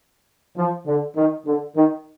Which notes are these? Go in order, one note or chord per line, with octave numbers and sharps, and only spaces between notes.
F3
D3
D#3
D3
D#3